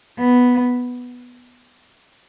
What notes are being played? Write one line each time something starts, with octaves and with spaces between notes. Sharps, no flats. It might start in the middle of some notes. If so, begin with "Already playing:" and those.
B3